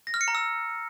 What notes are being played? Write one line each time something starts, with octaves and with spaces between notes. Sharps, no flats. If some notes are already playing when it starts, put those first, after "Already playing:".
A#6
F6
C#7
A#5
E6